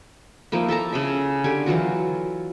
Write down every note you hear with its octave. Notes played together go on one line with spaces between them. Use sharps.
F3 A#3 D#4 E4
A4 E5 A5 A#5
C#3 G#4 E5
D3 G4 G#5
E3 F#3 F4 F#4